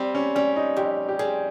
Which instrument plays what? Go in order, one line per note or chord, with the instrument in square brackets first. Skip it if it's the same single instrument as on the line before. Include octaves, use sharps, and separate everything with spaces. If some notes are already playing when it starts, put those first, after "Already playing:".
Already playing: [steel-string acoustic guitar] G3 [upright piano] C4
[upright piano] C#4
[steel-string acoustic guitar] G3 [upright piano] C#4
[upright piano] D#4
[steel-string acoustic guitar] F2 [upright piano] G4
[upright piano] G4
[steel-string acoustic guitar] G3 [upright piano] G#4